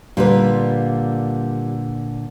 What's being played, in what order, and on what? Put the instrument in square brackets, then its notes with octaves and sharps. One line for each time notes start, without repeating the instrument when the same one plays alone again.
[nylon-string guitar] A#2 D3 B4 [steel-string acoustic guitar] G3 F4